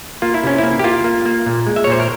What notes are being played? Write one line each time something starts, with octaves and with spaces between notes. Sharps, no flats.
A#3 F4
E4
C3 C#4
A#3 E4
G4
A#3 F4
A#3
A#3
A#2
G#3
E5
C#5
A#2 C5
A#4